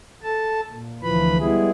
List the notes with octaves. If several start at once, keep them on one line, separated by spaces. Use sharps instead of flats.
A4 A5
A#2
D2 E3 F3 B4 B5
G3 G#3 B3 E4 G#4